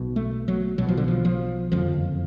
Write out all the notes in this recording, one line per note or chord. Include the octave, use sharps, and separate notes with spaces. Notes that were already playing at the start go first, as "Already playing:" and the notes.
Already playing: B1 B2
A3
F#3
B1 B2 F#3
F3
D3
F3
F3
F#1 F2 D3 F3